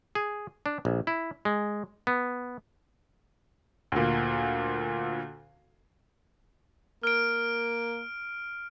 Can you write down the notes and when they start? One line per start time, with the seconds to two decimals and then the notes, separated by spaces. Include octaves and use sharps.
0.15 G#4
0.66 D4
0.85 A#1
1.07 E4
1.45 G#3
2.07 B3
3.92 D2 A#2
7.03 A#3 F6 D7